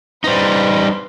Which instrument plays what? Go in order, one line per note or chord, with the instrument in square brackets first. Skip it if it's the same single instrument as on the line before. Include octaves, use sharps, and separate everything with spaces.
[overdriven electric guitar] G3 D#4 [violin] B4 C5